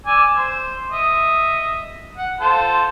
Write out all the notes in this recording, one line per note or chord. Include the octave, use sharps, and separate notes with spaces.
D5 G#5 E6
C5
D#5 E5
F#5
F4 A4 C5